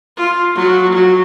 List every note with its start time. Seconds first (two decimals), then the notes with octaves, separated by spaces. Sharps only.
0.16 F4
0.55 F#3
0.93 F#3